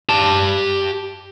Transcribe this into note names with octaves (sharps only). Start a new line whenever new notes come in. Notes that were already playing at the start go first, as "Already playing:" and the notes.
G4 A5